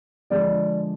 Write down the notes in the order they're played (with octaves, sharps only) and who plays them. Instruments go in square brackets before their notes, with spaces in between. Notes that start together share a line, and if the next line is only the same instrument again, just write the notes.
[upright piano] D3 F3 G#3 D5